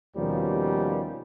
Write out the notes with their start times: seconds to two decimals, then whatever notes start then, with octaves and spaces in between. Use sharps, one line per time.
0.17 D#2 B2 F3 G3 A#3 C#4